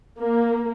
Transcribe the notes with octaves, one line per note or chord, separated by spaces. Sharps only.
A#3